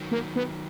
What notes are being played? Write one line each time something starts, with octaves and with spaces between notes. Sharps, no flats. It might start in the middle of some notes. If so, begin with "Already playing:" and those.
Already playing: D#3 F#3
A#3
B3